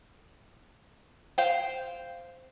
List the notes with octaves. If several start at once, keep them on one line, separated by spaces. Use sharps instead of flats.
C5 F5 G5